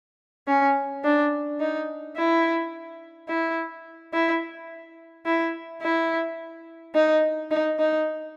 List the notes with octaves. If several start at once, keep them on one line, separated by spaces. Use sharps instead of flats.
C#4
D4
D#4
E4
E4
E4
E4
E4
D#4
D#4
D#4